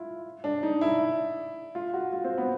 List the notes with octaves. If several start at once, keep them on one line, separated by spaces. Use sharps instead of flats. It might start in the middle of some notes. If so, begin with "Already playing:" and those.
Already playing: E4 F4
D4
D#4
E4
F4
F#4
F4
C4
B3